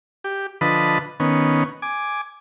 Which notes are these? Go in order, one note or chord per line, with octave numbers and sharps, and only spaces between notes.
G4
D3 F3 B4 D#5 A5 B5
D#3 B3 C#4
G#5 D6